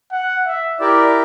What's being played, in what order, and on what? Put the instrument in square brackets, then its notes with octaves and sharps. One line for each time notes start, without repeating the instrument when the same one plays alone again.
[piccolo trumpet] F#5
E5
[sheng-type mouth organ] E4 G4 A#4 [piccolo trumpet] D5